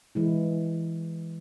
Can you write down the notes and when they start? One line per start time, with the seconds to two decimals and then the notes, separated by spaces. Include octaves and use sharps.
0.15 E3 G#3 E4